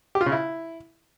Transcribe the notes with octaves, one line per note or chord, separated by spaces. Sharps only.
G4
F4
C#3
E4